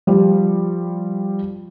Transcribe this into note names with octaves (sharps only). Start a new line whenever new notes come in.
F3 G3